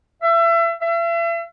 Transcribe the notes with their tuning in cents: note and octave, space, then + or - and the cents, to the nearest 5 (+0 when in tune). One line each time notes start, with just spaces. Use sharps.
E5 +30
E5 +40